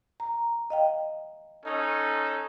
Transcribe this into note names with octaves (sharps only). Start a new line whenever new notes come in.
A#5
D#5 F5 G5
C#4 D#4 A4